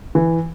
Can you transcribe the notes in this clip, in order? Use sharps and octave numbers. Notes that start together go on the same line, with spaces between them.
E3